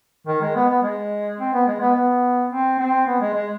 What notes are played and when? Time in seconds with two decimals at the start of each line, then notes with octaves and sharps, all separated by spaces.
0.27 D#3
0.41 G#3
0.55 B3
0.69 B3
0.83 G#3
1.40 C4
1.53 B3
1.67 G#3
1.80 B3
1.95 B3
2.51 C4
2.79 C4
3.07 B3
3.21 G#3
3.34 G#3